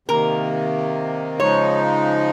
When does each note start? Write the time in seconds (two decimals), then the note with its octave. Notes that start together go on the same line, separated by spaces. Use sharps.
0.08 C3 D#3 A#3 A#4
1.40 C#3 F3 G#3 D#4 C#5